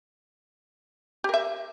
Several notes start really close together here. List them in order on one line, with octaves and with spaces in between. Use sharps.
G4 A#4 E5